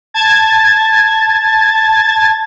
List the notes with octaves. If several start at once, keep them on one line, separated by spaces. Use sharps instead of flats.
A5 G#6 A6